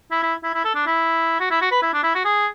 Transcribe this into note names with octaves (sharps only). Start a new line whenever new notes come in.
E4
E4
E4
E4
A4
D4
E4
F#4
E4
F#4
B4
E4
D4
E4
F#4
G#4